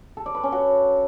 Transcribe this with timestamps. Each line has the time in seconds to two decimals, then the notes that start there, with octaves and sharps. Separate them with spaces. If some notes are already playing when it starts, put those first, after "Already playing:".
0.17 A4
0.26 D5
0.35 B4
0.44 C#4
0.52 F#4